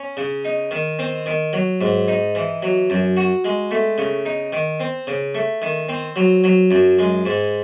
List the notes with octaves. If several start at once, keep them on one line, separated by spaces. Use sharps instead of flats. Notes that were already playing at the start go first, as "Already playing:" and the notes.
Already playing: C#4
C#3
D#4
D#3
C4
D#3
F#3
G#2
D#4
E3
F#3
F#2
F#4
G#3
A3
C#3
D#4
D#3
C4
C#3
A3
D#3
C4
F#3
F#3
F#2
G#3
G#2